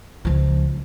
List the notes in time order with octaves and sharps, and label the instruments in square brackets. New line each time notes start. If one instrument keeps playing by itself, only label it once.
[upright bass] C#2 F3